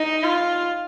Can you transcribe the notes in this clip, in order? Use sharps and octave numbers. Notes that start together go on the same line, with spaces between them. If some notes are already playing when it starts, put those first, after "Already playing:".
Already playing: D#4
F4